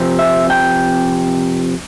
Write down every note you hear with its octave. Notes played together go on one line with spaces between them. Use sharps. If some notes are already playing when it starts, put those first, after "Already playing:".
Already playing: C3 F3 C4
E5
G5